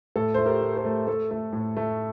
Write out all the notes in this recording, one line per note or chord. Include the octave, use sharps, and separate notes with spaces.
A2 A4
A3 C5
G4 A#4
A3
A4 C5
A3
A3 A4
A3
A2
A3